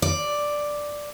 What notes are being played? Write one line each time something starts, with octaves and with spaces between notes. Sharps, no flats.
D5